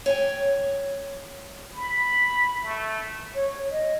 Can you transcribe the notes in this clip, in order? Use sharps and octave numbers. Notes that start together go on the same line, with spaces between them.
C#5 G5 G#5
B5
A3
C#5
D#5